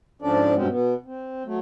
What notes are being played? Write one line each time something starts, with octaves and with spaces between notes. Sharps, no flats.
G#2 F3 C#4 D4 A4 D5
G2 B2 F#3 G#3 C4 C#4
B2 B3
C4
F#3 A3